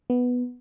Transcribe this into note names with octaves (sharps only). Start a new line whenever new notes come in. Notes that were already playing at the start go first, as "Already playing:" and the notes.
B3